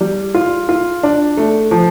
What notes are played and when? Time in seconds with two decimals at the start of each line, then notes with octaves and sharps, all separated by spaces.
0.01 G3
0.34 F4
0.69 F4
1.03 D4
1.37 A3
1.71 F3